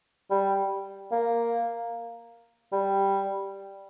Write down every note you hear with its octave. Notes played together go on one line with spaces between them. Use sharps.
G3
A#3
G3